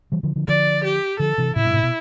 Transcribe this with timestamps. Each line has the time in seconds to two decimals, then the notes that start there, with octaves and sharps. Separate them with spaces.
0.12 E3 G3
0.23 D3 F3
0.36 D3 F3
0.48 D3 F3 D5
0.84 G4
1.19 D3 F3 A4
1.38 C3 E3
1.56 A2 C3 E4
1.64 G2 B2
1.73 A2 C3
1.83 B2